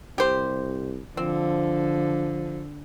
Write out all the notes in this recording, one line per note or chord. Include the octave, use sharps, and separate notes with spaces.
C2 G4 C5
D3 F3 C4